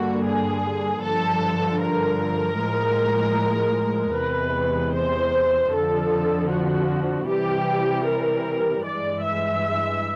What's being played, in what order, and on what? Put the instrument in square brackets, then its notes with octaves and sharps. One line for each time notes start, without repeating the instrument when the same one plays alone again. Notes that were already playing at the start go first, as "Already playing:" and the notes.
Already playing: [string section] G2 D3 G3 A#3 F#4
G#4
G2 D3 F3 A4
A#4
A2 F3 G#3
E2 C3 E3 G#3 B4
C5
F2 D3 F3 A4
F#4
C3 E3 G3 G4
A#4
G2 E3 G#3 D5
E5